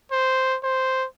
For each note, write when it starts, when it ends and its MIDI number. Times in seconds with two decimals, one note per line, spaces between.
0.12 0.57 72
0.64 1.05 72